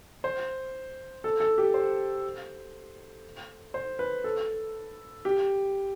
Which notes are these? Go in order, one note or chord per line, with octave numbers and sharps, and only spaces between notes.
C5
A4
A4
G4
C5
C5
B4
A4
G4